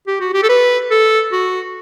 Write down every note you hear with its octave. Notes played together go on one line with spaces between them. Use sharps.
G4
F#4
G4
A4
B4
A4
F#4